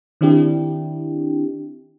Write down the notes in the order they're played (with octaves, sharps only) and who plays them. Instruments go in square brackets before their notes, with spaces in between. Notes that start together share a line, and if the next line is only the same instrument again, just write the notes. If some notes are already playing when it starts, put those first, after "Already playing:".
[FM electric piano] D#3 C4 D4 E4 G4